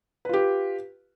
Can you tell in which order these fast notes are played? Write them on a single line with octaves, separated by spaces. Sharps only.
B4 F4 G4